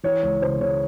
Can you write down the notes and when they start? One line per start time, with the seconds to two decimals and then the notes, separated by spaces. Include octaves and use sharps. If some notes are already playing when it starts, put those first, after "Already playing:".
0.03 E3 C#5
0.22 C#2 C#5
0.42 C#3 C5
0.61 C#3 C#5